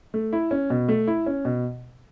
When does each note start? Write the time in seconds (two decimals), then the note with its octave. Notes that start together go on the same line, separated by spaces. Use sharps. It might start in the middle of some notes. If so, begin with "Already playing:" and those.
0.14 A3
0.33 E4
0.51 C#4
0.70 B2
0.88 A3
1.07 E4
1.26 C#4
1.45 B2